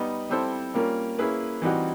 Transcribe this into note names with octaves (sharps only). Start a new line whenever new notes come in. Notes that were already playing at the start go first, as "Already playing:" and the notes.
Already playing: G3 B3 D#4
G3 C4 E4 A4 C5
G3 A#3 C#4 F4 A#4
A#3 C#4 E4 G#4 B4
E3 G3 C4 D#4 F#4